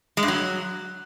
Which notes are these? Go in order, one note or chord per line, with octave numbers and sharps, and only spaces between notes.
G#3
G2
F#3